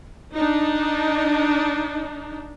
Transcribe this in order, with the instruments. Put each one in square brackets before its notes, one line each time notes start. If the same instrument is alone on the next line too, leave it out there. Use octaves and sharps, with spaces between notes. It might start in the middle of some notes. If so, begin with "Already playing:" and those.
[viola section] D4 D#4